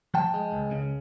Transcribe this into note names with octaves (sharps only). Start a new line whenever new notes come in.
F3 G5 A5
G#3
C#2
C#3